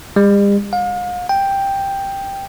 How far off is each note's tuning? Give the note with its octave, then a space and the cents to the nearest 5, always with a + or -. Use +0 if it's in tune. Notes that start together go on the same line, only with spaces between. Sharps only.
G3 +45
F5 +40
G5 +5